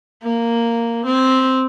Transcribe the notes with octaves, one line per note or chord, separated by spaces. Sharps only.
A#3
C4